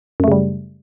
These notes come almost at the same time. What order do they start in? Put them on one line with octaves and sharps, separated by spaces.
F#2 A3 C#3 G3